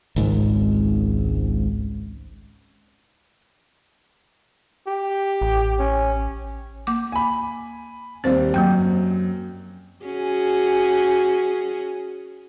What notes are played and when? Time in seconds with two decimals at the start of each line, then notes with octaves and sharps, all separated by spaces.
0.16 G#1 C#2 G#2
4.87 G4
5.42 A1
5.79 C#4
6.87 A#3 D6
7.12 G#5 B5
8.24 D#2 G3 C4 C5
8.54 F#2 F#3 A#3 G5
10.05 C#4 F#4 G#4